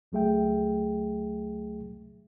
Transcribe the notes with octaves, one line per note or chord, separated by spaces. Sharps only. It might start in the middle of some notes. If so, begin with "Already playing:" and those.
C#2 F#3 A3 G#4 E5 G5